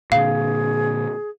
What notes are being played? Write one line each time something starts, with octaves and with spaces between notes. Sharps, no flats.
A#2 D3 G#4 F5